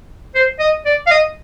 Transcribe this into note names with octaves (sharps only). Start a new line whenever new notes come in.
C5
D#5
D5
F5
D#5